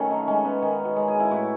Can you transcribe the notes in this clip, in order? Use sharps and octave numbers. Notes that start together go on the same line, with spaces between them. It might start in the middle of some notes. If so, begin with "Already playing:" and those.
Already playing: D#3 F#3 A3 C#4 F#4 A4 B4 C#5
D#4
G#3 C#4
B3
D#3 D#4
F#4
G#3
G#4
E4
A2 F#4